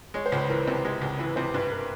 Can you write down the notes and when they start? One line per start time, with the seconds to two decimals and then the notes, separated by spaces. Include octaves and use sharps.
0.14 G#3 C#5
0.26 C5
0.32 C#2
0.37 B4
0.49 E3 A#4
0.67 C3
0.85 G#3
1.01 C#2
1.19 E3 B4
1.36 C3 C5
1.54 G2 B4
1.72 A#4